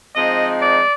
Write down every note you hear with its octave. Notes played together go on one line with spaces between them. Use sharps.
F3 G#3 C4 D#4 D#5
D5